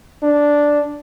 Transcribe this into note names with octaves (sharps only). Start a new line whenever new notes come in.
D4